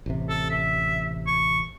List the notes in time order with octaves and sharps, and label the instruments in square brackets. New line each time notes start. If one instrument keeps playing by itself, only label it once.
[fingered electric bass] A1 C3
[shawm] A4
E5
C#6